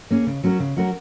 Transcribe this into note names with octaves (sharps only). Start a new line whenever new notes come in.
A#3 C#4 G#4
C#3
F#3 C#4 F#4 A#4
C#3
F#3 C#4 F#4 A#4